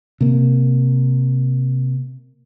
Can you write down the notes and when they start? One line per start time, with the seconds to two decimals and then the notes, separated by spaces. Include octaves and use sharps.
0.21 C3 A#3